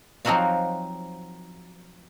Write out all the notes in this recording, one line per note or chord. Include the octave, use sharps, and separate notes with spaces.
F3 F#3 C4 D#4 F#4 F5